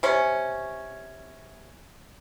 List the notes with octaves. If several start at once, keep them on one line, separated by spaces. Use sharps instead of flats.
C3 C#4